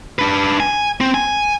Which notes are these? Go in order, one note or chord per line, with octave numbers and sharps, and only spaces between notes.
D4 B4
G#5
C4
G#5